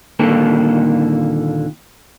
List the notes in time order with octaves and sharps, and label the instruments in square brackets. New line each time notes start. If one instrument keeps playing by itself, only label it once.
[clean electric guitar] D#2 A#2 D3 A#3 A4